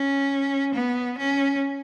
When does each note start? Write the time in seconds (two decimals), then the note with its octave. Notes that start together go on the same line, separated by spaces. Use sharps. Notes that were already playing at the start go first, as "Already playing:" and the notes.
Already playing: C#4
0.74 B3
1.18 C#4